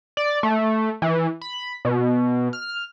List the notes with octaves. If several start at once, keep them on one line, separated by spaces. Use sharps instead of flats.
D5
A3
E3
B5
B2
F6